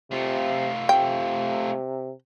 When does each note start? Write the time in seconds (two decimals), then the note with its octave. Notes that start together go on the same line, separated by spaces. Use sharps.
0.11 C3 A3 F4
0.89 C3 G5